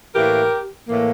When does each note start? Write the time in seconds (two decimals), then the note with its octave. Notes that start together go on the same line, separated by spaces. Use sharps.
0.15 A2 E3 A#3 G4 A#4
0.89 A2 E3 A#3